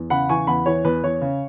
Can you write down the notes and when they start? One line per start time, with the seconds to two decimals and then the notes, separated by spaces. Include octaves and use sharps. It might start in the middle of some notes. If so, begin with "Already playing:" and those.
Already playing: E2
0.10 C#3 F#5 B5
0.29 E3 G#5 C#6
0.47 E2 F#5 B5
0.66 E3 C#5
0.85 E2 B4
1.04 E2 C#5
1.21 C#3